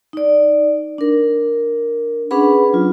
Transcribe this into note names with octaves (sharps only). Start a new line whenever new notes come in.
D#4 D5
D4 A#4
C#4 D4 G#4 B4 F#5 B5
F#3 F4